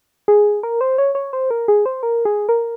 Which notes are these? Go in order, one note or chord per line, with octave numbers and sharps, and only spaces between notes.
G#4
A#4
C5
C#5
C#5
C5
A#4
G#4
C5
A#4
G#4
A#4